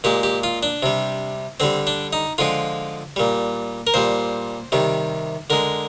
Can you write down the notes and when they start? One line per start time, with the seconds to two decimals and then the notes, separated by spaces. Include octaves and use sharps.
0.04 A#2 G#3 G4
0.23 G4
0.43 F4
0.63 D4
0.83 C3 G3
1.60 D3 G3 C4
1.87 D4
2.13 D#4
2.38 D3 F3 G#3 F4
3.16 A#2 G3
3.87 A#4
3.94 A#2 G3 C5
4.72 C3 D#3 G3
5.50 D3 G#3 A#4